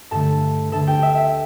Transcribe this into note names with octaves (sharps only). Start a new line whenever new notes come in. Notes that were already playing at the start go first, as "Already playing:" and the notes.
G2 D3 A3 A4 A5
D2 D3 A3 A4 A5
G4 G5
E5
E5